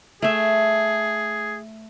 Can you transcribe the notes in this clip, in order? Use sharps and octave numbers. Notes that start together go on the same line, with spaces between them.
A3 G#4 E5